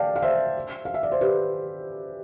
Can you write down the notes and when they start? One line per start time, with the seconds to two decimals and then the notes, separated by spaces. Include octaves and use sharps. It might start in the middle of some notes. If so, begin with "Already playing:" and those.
Already playing: D5 F5 G5 A5
0.16 F5
0.22 C5 E5
0.85 F5
0.94 E5
1.03 D5
1.12 C5
1.21 G4 B4